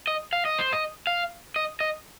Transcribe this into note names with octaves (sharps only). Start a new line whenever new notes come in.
D#5
F5
D#5
C5
D#5
F5
D#5
D#5